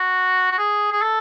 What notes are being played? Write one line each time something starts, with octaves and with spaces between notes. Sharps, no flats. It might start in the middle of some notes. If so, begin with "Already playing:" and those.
Already playing: F#4
F#4
G#4
G#4
A4